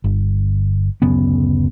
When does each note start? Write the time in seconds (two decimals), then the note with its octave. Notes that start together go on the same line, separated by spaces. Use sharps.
0.04 G1
1.02 D1 F#2 C#3 B3